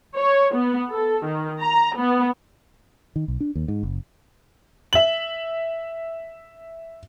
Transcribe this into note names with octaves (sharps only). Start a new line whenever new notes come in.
C#5
B3
A4
D#3
A#5
B3
D#3
B1
D4
D#2
G#2
F#1
E5 F#7